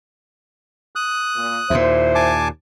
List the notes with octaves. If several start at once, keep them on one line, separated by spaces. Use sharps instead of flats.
D#6 F#6
A#2
D#2 A#2 E4 C5
G#5 A5 D6